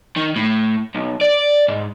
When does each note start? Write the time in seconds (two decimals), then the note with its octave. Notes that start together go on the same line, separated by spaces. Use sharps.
0.16 D#3
0.36 A2
0.95 B1
1.21 D5
1.68 G#2